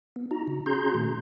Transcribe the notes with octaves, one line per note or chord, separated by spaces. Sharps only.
B3
D#4 F#4 A#5
C#3
C#4 F#4 G#4 A#5 C6 G6
A#2 D#3 A3